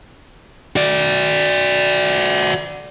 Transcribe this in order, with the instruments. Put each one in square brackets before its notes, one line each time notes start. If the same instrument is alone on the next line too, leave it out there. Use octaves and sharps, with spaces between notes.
[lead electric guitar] F#4 D5